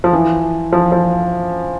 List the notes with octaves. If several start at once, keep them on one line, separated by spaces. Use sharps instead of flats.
F3
E3
F3
F3